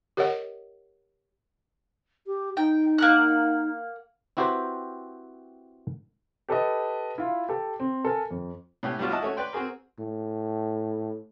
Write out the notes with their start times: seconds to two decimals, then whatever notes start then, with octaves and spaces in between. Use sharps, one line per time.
0.17 G4 A#4 C#5 D#5 F#5
2.27 G4
2.57 D#4 G5
2.98 A#3 F#5 F#6
4.37 C4 E4 F#4 G4 B4 C5
6.49 G4 A4 B4 D#5
7.18 E4 F4
7.49 G4 A4
7.80 C4
8.05 A4 A#4 G#5
8.31 F2
8.83 A2 B3 C#4 G4
8.99 G3 B3 D4 F4 F#4
9.11 E4 F#4 D#5 A5
9.22 A3 C#4 F#4
9.37 B4 D5 G5 C6
9.53 C4 F#4 G#4 A#4
9.99 A2